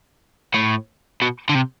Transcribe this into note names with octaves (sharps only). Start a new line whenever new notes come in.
A2
B2
D3
C3